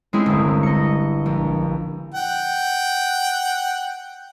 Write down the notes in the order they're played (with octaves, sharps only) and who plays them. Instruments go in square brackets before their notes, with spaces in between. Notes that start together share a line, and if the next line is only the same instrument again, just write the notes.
[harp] G#3 C4 C#4 E4 G#4
G1 C2
D#5 C#7
A#1
[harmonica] F#5 G5